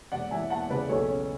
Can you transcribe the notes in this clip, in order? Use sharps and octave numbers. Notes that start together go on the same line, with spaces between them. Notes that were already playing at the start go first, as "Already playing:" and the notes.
E1 D5 F#5
E3 E5 G#5
E2 F#5 A5
C#3 B4 D5
B1 A4 C#5
C#4